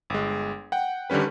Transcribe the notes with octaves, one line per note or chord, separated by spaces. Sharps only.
G1 G#3
F#5 G5
D3 D#3 G3 C#4 B4